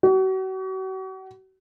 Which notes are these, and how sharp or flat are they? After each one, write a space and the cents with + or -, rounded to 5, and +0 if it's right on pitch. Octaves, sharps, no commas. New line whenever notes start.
F#4 +40